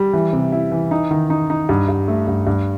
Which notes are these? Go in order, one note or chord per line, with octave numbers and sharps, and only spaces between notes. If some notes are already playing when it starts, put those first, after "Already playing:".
Already playing: G3
E3
C3
E4
E3
D#4
D#3
D#4
D#4
G2
G2
A3
G2
G2